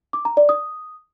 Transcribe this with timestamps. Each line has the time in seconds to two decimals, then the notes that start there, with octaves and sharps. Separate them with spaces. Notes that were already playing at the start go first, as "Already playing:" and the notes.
0.13 D6
0.25 A#5
0.37 D5
0.49 D#6